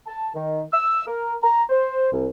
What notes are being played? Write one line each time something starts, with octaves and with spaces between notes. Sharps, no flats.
A5
D#3
E6
A#4
A#5
C5
C2